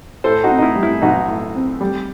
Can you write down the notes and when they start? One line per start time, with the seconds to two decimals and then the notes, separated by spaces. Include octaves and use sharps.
0.24 A2 A4 C5
0.44 D#4 F#4
0.51 C4
0.58 D#4
0.62 E4
0.75 G3
0.83 E4
1.02 B1 D#4 F#4
1.28 A2
1.55 C4
1.81 G3